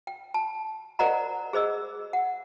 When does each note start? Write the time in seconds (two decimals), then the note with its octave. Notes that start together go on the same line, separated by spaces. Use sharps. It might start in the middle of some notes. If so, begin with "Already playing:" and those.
0.07 G5
0.34 A5
0.99 A#4 C5 D5 D#5 F#5 A#5
1.53 G#4 C5 D#5 E6
2.13 F#5